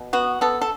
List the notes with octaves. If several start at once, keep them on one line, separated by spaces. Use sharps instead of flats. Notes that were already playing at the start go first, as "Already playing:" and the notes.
Already playing: B2
B3 F#4
B3 A4
A4